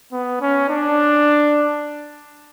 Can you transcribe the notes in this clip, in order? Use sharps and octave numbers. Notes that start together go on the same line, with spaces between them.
B3
C#4
D4